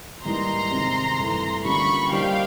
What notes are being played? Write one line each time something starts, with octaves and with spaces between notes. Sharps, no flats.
G#2 E3 G3 A#3 D#4 A#5 C6
C3 D#3 G#3 C4
G2 E3 A3
D3 G3 A#3 C#4 F4 B5 C#6
G3 A#3 D#4 G4 C5 F5 G5